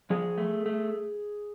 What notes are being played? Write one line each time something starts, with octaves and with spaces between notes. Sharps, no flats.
F3 G#4
A3
A3